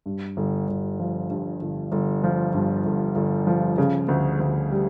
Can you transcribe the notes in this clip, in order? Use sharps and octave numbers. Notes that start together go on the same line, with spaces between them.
G2
G1
G1
F3
G2
G1
G1
F3
G2
G1
G1
F3
C#3
D2
D2
G3